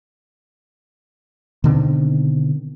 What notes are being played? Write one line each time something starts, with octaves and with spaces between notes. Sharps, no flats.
B2 D3 D#3 C4